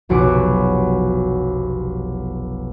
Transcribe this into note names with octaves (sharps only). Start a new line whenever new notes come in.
F1 B1 F#4 D6 C#7